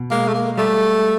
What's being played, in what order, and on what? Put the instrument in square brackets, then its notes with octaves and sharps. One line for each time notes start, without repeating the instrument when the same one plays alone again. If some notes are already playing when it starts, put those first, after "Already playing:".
Already playing: [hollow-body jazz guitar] B2
[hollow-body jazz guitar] G#3 [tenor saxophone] A#3
[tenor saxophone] A3
A#3
[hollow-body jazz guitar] G3 [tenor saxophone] A3